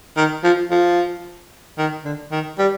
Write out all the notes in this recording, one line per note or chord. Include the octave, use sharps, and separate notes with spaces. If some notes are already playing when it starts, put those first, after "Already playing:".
D#3
F3
F3
D#3
D3
D#3
G3